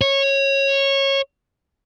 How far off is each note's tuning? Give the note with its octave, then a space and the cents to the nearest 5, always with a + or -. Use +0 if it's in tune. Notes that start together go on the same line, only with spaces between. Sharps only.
C#5 -15